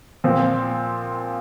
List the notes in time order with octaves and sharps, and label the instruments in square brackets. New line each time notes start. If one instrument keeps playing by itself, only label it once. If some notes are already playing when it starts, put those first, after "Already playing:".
[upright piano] A#2 F3 C4